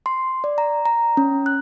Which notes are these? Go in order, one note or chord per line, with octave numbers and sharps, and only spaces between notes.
C6
D5
A#5
A#5
C#4
F#6